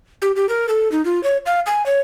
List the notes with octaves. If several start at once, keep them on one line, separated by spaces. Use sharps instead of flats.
G4
G4
A#4
A4
D#4
F4
C#5
F5
G#5
C#5